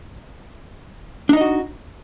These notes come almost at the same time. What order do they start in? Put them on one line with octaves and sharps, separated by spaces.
D4 D#4 D#5 F#4